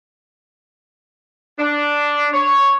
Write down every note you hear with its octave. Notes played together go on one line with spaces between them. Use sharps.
D4
C#5